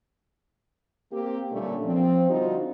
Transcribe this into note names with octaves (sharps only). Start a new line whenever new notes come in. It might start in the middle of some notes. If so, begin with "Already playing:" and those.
A#3 C4 G4
A#2 D3 G3 A3 C#4 D4
F3 C4
D3 G3 C4 D#4 F4 F#4